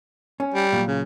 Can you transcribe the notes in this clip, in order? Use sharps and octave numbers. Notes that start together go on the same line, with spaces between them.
C#4
G3
A#2 F#3
C#3